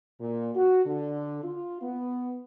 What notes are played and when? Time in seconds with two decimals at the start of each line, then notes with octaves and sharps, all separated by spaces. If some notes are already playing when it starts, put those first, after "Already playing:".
0.19 A#2
0.53 F#4
0.84 D3
1.43 F4
1.81 B3